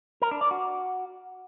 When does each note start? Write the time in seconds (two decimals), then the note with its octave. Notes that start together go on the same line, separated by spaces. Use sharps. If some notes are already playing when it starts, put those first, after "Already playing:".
0.22 A#4
0.31 D4
0.41 D5
0.51 F#4